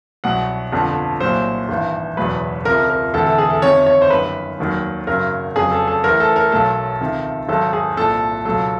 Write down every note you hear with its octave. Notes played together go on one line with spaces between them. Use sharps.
C2 B2 F#3 F#5
G1 F2 D3 F3
C2 A#2 F#3 C5
G#1 G2 E3
F#1 E2 B2 F#3 B4
C#2 C3 F3 A#4
A#4
E1 D2 C3 E3 A4
A4
G#4
A4
G1 F2 C3 D#3 C#5
C#5
C5
G1 F#2 D#3 B4
F1 D#2 D#3 F#3
G#1 F#2 C#3 F#3 A#4
F1 F2 C#3 F#3 G#4
A4
A4
A1 A2 E3 A#4
A4
A#4
B1 B2 F#3 A4
C#2 C3 D#3
G#1 G#2 D#3 F#3 A4
G#4
C2 A#2 F3 A4
C#2 B2 F#3 A4